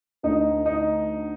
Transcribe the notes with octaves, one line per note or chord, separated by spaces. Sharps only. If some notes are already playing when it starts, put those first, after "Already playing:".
D2 D3 D#4
D#4